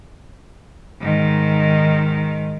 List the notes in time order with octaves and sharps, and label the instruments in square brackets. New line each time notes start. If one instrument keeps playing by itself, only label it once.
[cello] G#2 D#3